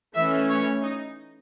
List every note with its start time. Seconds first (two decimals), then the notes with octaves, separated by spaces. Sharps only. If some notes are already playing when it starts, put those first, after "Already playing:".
0.14 E3 A3 C#4 E5
0.49 C#5
0.83 D#4